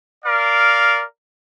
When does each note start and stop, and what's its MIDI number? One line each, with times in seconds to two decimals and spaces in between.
0.25 1.03 70
0.25 1.03 74
0.25 1.03 77